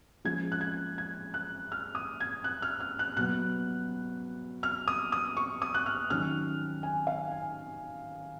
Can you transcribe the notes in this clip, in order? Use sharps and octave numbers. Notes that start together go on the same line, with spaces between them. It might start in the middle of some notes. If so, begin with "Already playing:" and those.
F3 G#3 C#4 G#6
F#6
G#6
G#6
F#6
F6
D#6
G#6
F#6
F6
F6
F#6
B2 F#3 B3 F#6
F6
D#6
D#6
C#6
D#6
F#6
F6
D#3 F#3 C#4 F6
G#5
F5
G#5